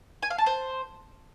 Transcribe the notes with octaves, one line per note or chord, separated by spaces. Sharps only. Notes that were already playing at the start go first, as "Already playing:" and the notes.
G#5
F5
A5
C5